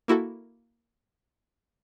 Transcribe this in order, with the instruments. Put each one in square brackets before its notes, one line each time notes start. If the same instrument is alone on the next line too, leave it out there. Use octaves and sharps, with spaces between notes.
[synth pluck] A#3 E4 F#4 A4